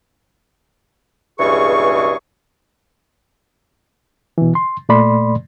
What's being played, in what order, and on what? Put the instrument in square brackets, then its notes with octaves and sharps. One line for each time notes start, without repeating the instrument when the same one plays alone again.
[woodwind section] C#2 G2 B2 E3 G#4 C#6
[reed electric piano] B2 E3
C6
A#2 A3 D5 B5 C6